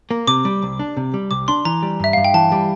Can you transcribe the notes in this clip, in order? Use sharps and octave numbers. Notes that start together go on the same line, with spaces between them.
A#3
C3 D6
G3
C2
D4
C3
G3
C2 D6
D4 C6
E3 A#5
G3
G2 E5
G2 F5
G5
E3 A5
G3